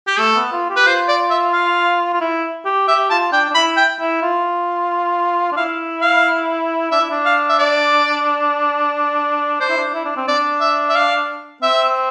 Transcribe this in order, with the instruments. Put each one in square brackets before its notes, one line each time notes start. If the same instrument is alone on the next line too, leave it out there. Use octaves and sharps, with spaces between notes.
[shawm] G4
[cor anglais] A3 [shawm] A4
[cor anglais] B3
F4
G4
[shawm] B4
[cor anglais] F4 [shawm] C5
[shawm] D5
E5
F5
[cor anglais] F4
E4
G4
[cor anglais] G4 [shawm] E5
[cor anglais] F4 [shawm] A5
[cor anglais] D4 [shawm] G5
[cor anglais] D4
[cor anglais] E4 [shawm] B5
[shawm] G5
[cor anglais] E4
F4
D4
[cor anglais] E4 [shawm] F5
[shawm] F5
[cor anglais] D4 [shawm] E5
[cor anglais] E4
D4
[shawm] F5
E5
D5
[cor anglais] D4 [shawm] C5
[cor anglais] E4
D4
E4
D4
C4
[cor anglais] D4 [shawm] D5
[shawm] E5
E5
F5
[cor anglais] C4 [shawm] E5